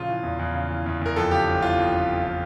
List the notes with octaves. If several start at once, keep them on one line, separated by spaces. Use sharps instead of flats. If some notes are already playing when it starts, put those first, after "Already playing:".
Already playing: A#1 C#3 F4
E3
E2
E2
C#3
E3
E2
E2 A#4
F2 A4
C#3 G4
G1
E3 F4
F2
C#3
G1
E3